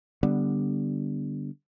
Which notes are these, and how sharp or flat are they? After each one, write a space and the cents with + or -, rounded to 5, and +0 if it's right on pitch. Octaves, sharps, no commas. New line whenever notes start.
D3 +0 G3 +0 B3 +0